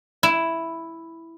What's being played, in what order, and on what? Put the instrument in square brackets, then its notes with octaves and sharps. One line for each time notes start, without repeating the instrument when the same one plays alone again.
[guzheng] E4